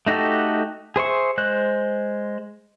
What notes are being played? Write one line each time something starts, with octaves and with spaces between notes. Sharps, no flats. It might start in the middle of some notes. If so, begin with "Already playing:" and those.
A3 D#4 F#4 G4 A4
G#4 C5 E5 C#6
G#3 C5 F#6